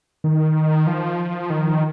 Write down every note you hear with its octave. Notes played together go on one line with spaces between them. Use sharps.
D#3
F3
D#3